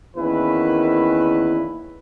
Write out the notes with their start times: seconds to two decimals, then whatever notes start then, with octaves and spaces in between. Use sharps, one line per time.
0.17 E2 D#3 A#3 C#4 E4 B4